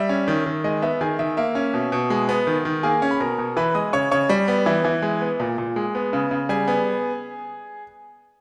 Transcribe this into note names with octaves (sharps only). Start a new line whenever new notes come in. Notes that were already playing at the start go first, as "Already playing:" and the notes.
Already playing: G3 E5
C#4
D#3
D#3
G#3 D#5
B3 E5
D#3 G#4 G#5
D#3 E5
A#3 E5
C#4
B2
B2
G#3
B3
D#3
D#3
A#3 G#4 G#5
C#4
B5
B2 A#4 A#5
B2
E3 B4 B5
G#3 D#5 D#6
C#3 C#5 C#6
C#3 C#5 C#6
G3
B3
E3
E3
G#3
B3
A#2
A#2
G#3
B3
C#3
C#3
G3 G#4 G#5
B3